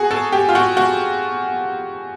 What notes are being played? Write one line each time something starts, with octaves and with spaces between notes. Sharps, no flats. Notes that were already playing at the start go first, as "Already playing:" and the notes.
Already playing: F#4 G#4
A4
G4
F4
F#4
F#4